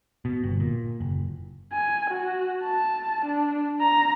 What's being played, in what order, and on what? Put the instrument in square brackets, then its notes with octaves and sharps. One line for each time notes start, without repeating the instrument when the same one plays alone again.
[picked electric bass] B2
G1
A#2
F#1
[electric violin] G#5
F#4
A5
D4
A#5